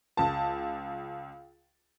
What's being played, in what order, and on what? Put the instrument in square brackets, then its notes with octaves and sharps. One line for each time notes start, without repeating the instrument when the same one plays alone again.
[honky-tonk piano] C#2 A5